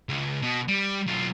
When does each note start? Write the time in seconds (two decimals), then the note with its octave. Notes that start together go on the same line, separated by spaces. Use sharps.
0.09 C#2
0.42 B2
0.68 G3
1.06 B1 F4